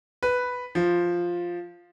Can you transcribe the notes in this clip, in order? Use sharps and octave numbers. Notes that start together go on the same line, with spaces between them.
B4
F3